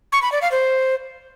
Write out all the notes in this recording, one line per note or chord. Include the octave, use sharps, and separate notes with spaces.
C#6
B5
D5
F5
C5